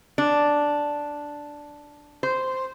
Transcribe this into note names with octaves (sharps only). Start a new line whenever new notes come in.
D4
C5